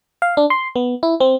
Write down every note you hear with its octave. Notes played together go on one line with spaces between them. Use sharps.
F5
D4
C6
B3
E4
C4